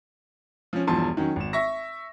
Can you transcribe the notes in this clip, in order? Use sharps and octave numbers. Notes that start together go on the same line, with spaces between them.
F3 C#4
E1 E2 G2 F3 A5 C6
D#3 F#3 C#4
G#1 E7
E5 C#6 A#6